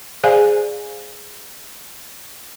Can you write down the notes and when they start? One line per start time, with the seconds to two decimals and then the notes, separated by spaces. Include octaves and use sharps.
0.24 G#4 C5 D5 F5 G#5